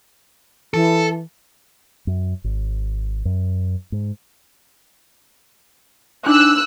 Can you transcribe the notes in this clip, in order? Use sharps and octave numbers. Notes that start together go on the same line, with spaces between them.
E3 A4
F#2
G#1
F#2
G#2
D4 D#4 D6 E6 F#6